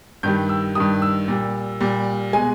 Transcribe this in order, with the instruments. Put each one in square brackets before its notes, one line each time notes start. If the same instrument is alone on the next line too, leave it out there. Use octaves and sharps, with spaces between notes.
[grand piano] G2 D#3 G3 G6
E6
G2 D#3 G3 D#6
E6
A#2 G3
A#2 G3
B2 G#3 G#5